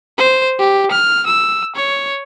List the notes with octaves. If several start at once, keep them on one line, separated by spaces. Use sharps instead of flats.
C5
G4
F6
E6
C#5